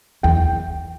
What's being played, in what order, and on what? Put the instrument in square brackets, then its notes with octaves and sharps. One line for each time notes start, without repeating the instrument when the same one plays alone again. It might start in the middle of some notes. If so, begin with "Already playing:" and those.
[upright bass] E2 [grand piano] G5